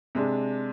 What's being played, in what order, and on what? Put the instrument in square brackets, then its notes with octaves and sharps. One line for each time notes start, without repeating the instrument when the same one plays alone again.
[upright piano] C3 G#3 D4